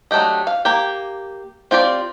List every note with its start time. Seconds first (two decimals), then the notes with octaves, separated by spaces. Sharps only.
0.11 F#3 A3 D4 G4 D#5
0.47 F5
0.65 A#3 G4
1.71 C4 F4 G4 D5